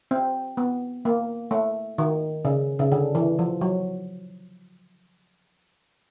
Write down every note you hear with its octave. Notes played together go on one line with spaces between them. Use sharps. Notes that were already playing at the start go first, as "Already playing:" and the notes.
C4
B3
A#3
A3
D#3
C#3
C#3
D3
E3
F3
F#3